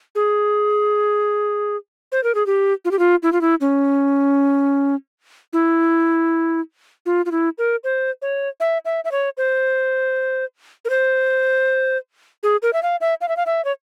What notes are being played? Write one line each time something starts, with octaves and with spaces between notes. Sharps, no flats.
G#4
C5
A#4
G#4
G4
F4
G4
F4
E4
F4
E4
C#4
E4
F4
F4
E4
A#4
C5
C#5
E5
E5
E5
C#5
C5
A#4
C5
G#4
A#4
E5
F5
E5
F5
E5
F5
E5
C#5